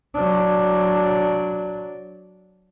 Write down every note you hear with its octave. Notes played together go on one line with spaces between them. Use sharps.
F#3 D4